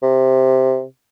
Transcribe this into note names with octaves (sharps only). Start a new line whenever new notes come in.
C3